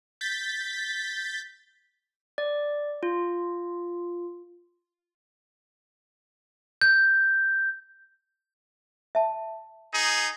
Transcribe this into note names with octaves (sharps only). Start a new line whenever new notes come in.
G6 A6 B6
D5
F4
G6
E5 A5
D#4 G#4